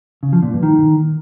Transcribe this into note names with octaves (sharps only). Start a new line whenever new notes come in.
C#3
F3
A#2
G2
D#3